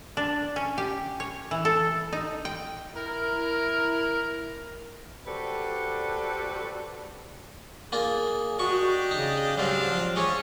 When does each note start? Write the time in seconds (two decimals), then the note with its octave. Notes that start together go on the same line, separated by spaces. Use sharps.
0.17 D4
0.56 C#4
0.78 G4
1.20 C#5
1.51 E3
1.65 A4
2.13 D#4
2.45 G5
2.95 E4 A#4
5.26 F#4 G4 A4 B4 C5 D5
7.92 A#3 D4 F4 G#4
8.59 D4 F#4 G4 D#5 C#6
9.11 C#3 D#4
9.58 G#2 F#3 G3 C4 D4 F5
9.85 F3
10.16 G#3 C#4 D4 C#5